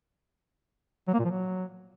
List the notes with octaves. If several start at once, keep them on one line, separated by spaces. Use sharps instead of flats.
F#3
A#3
A#2
F3
F#3